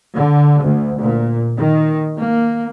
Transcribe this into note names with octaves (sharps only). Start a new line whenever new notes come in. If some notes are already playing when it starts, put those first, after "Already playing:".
D3
D2
A#2
D#3
A#3